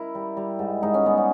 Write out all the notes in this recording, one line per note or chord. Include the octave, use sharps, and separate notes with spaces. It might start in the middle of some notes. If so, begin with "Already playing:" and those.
Already playing: E4 A#4
G3
G3
G#2
G#2 D#4
C#4
G3 B3
C#4